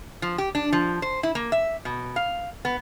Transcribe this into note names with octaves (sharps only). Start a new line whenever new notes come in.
F3
G4
D4
F3
C5
E4
A#3
E5
B2
F5
B3